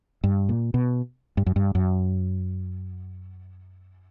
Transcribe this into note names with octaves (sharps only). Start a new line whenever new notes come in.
G2
A#2
B2
G2
F#2
G2
F#2